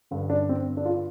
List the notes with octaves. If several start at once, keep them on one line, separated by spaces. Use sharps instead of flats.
G2 D3
D4
C4
D4
F4